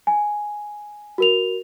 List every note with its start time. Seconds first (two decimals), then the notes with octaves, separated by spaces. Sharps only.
0.07 G#5
1.18 F#4 A#4 F7